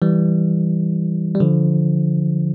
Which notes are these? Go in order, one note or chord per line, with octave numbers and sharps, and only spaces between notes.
E3 G3
G3
D3 F3